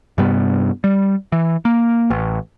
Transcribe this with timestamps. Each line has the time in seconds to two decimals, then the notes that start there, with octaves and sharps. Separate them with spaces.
0.18 G2 C3 G3 B3
0.84 G3
1.32 E3
1.65 A#3
2.10 A1